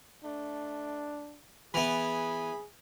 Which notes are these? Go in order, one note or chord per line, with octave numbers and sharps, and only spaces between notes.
A3 D4
E3 B3 G#4 B5